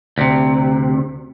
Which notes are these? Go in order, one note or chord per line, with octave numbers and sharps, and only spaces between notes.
D2 C3